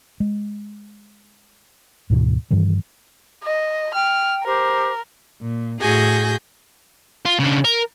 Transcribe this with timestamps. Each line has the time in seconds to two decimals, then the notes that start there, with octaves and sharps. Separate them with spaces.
0.20 G#3
2.10 D2 G#2 B2 E3
2.51 G2 D#3 E3 G3
3.44 D#5
3.94 G5 F6
4.44 G4 A#4 C5
5.41 A#2
5.81 A2 F#4 G#4 G#5 G6 A#6
7.25 F4
7.40 C#3 D4
7.64 A#4